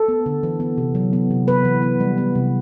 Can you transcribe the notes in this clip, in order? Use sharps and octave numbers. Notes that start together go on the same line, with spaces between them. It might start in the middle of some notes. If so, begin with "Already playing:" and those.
Already playing: A4
B3
D3
E3
B3
C3
F#3
B3
C3
B3 B4
E3
B3
G3
B3
C3